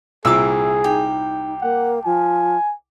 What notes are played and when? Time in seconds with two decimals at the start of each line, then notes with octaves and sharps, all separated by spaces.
0.25 C2 A#2 G#4 E5 D6 E6
0.84 D#4 G4
1.62 A#3 F#5
2.05 F3 G#5